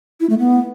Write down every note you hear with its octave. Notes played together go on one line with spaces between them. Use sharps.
E4
A3
B3